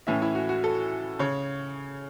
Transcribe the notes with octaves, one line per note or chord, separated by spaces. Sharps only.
A2 E3 C#4 E5
E4
F#4
F#4
A4
C#3 C#5